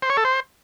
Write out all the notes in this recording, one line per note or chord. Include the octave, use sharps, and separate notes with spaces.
C5
C#5
A4
C5